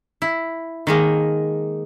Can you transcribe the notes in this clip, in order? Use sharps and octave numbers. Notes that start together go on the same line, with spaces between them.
E4
D#3 G#3 A#3